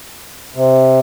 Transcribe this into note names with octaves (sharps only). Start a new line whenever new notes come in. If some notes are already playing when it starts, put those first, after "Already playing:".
C3